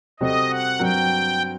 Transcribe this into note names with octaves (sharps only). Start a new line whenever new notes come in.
C3 G3 C4 F#4 A4 D#5
F#5
G2 F#3 C4 F#4 A#4 G5